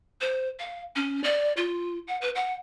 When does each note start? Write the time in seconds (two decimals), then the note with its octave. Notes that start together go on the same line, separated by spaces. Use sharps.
0.21 C5
0.59 F5
0.96 C#4
1.24 D5
1.57 F4
2.07 F#5
2.21 B4
2.35 F#5